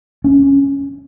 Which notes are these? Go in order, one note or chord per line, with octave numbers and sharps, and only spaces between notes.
C#4